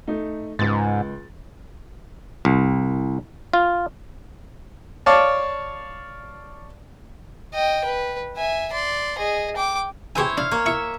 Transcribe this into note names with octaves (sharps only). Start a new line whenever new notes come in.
A3 D#4
C#2 G#2 A6
C2
F4
C#5 D5 F5 A5
D#5 G5
B4
E5 G#5
D5 C6
G#4 D#5
G5 D6
E4 G4 G#4 C5 C#5 G#5
D4 F5
A#3 C#5
E4 E5 C#6